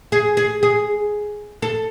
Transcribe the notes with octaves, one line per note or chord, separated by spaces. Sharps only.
G#4
G#4
G#4
A4